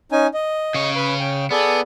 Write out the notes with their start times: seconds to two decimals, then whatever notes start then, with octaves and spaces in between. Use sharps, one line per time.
0.12 C#4 D#4 G#5
0.34 D#5
0.74 C#3 C#5
0.96 B4 B5
1.20 C#4 G5
1.51 B3 G#4 A4 D5